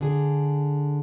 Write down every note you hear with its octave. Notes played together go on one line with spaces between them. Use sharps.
D3 G#4